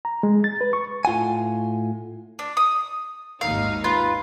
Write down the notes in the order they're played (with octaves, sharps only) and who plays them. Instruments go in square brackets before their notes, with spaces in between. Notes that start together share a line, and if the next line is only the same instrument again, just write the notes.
[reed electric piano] A#5
G#3
A6
B4
C#6
[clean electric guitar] A2 F4 F#5 G#5
[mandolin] D4
D#6
[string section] G#1 D#2 D#4 [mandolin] F5
[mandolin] F4 [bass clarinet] B4